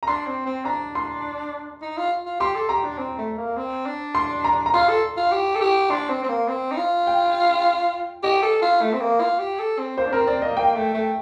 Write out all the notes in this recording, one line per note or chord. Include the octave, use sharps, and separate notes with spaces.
A#5
D4 C6
C4
C4
D4 A#5
C6
D#4
F4
F4
G4 C6
A4
G4 A#5
D4
C4
A3
A#3
C4
D4
C6
A#5
A#5
F4 C6
A4
F4
G4
A4
G4
D4 C6
C4
C4
A#3
C4
D#4
F4
G5
G4 D#5
A4
F4
A3
C4
A#3
F4
G4
A4
C4
A#3 C5
D4
C4 A#4
C4 D5
A#3 D#5
A#3 G5
A3
A3